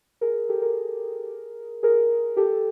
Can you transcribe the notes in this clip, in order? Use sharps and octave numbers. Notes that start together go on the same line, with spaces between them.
G#4 A#4
G4 A4
G#4 A#4
G#4 A#4
G4 A4